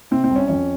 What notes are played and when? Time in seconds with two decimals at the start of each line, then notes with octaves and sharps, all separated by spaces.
0.11 C3 C4
0.24 C4
0.30 C2
0.36 C#4
0.48 F2 C#4